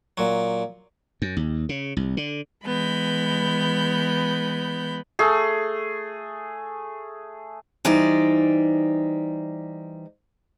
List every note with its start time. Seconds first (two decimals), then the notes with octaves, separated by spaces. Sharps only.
0.17 A#2 F#3
1.22 F#2
1.37 D#2
1.69 C#3
1.97 C2
2.17 D3
2.64 E3 G#3 B3 B5 G6
5.19 A3 G#4
7.85 E3 G3 D#4 C5 D5